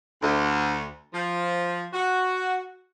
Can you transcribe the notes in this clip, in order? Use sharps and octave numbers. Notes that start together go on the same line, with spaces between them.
D2
F3
F#4